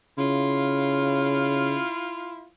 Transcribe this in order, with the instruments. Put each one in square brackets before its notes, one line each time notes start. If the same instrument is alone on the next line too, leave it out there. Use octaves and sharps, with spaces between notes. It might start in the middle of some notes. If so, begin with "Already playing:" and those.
[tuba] C#3 [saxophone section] E4 F4